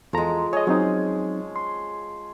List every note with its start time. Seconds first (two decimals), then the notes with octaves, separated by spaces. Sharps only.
0.13 E2 F3 G#3 A4 A#5
0.53 G#4 C#5 D#5
0.67 F#3 C4 C#4 D#4
1.56 C6